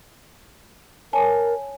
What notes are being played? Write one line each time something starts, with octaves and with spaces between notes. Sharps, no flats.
A#4 C#5 G#5 A5